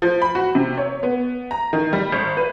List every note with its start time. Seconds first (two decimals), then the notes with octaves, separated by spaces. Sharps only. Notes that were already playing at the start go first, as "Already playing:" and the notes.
0.02 F3
0.22 B5
0.35 F#4
0.55 C3
0.77 C#5
1.03 B3
1.51 A#5
1.73 D#3
1.93 G3
2.12 G#1
2.37 B4